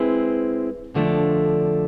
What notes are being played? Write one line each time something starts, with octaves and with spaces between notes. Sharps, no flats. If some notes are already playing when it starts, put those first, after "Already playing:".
Already playing: G#3 C4 E4 B4
F2 D3 F3 A3 D4